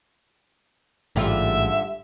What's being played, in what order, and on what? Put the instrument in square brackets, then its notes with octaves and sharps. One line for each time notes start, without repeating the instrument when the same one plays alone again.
[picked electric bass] A1 G#2 [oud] D3 G3 F4 [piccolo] E5